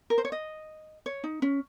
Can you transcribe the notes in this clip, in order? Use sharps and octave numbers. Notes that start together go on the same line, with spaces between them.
A#4
C5
C#5
D#5
C#5
D#4
C#4